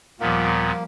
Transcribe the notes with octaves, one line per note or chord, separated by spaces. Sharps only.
D#2 A#2 F3 G3 A#3 B3